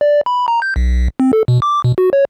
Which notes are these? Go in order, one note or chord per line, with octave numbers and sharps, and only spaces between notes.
D5
B5
A#5
G6
B1
C4
A4
B2
D6
B2
F#4
C#5